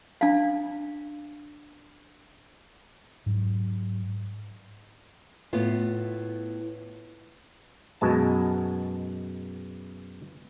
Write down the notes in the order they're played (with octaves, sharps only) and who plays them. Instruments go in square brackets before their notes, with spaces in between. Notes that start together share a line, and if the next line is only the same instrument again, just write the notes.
[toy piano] D4 F5
[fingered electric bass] G#2 F#3
[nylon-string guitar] A2 B3 F4
[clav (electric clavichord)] F#2 B2 G#3 A5